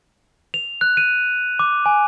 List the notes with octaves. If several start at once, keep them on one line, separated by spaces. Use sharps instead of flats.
F7
F#6
D#7
D6
G#5